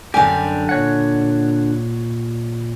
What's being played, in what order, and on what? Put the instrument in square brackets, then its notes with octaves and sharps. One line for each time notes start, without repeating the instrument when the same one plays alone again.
[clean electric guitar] F#2 G3 G4 [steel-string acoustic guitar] D3 G#5
[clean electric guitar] A#2 C#5 F#5